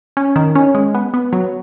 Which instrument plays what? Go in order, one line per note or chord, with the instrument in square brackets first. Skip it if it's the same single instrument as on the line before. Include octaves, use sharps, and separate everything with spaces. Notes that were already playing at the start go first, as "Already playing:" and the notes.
[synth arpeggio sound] C#4
D#3
C#4
G#3
B3
B3
F#3